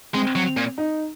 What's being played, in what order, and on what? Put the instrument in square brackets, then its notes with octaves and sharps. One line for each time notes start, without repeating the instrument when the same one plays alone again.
[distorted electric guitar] G#3 [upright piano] C4
[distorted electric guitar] F#3
A#2
[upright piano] D#4